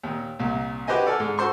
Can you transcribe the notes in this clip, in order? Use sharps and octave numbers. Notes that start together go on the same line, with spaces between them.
D#2 A#2
C2 A#2
F#4 G4 B4 C5 D#5 G#5
A4 D5 F#5 G#5 F6
G#2
F#4 A4 C5 C6 C#6